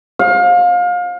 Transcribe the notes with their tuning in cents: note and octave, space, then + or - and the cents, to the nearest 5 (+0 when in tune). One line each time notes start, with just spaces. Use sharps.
F5 +30